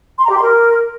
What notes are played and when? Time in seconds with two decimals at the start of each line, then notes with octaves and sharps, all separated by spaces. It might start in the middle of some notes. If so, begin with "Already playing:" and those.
0.18 C6
0.24 A#5
0.31 G4
0.37 C6
0.44 A#4